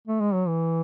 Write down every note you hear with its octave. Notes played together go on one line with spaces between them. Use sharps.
A3
G#3
F#3
E3